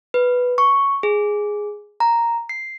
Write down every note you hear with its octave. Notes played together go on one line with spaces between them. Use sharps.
B4
C#6
G#4
A#5
C7